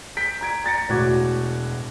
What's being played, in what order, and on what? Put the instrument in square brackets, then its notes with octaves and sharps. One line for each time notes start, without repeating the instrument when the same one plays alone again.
[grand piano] G6 B6 D7
A#5 G#6 D7
A#5 A6 A#6 C#7
E1 A2 F#4 D6 G#6